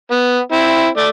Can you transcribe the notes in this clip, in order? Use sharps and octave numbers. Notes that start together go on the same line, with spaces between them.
B3
C4 E4
A3 D5